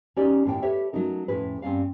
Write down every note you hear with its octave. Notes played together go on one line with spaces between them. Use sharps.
C#4 D#4 G4 D5 D#5
D#2 A2 A#4 G5
G4 A4 B4 C#5 E5
F#3 A3 C#4 D#4 A#4
F2 A2 C#4 G#4 B4
G2 C4 C#4 D5 F5